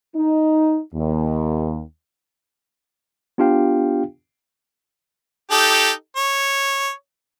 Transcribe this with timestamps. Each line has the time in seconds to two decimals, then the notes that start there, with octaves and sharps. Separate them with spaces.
0.16 D#4
0.95 D#2
3.38 B3 D4 F4 G4 F5 G5
5.51 D#4 G4 A4
6.16 C#5